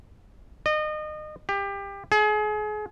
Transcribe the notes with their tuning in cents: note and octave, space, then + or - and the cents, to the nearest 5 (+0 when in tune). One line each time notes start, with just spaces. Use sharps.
D#5 -30
G4 +25
G#4 +35